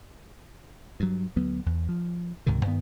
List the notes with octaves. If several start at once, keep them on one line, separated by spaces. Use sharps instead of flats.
G2 F#3
D2 F#3 B3
E2
F3
C#2 G#2 C3 D#3
G2 D#3 B3